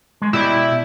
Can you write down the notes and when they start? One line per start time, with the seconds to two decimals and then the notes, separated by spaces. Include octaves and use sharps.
0.22 G#3
0.33 B2 E4 G4 D5